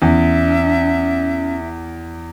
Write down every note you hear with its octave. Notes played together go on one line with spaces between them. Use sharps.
E2 C#4 E5